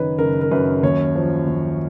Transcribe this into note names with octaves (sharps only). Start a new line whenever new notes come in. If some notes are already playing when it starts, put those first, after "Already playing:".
Already playing: F#1 D#3 B4 C#5
F#1 A#4
A#4
F#2 B4
D#2 C#5
F3
D#2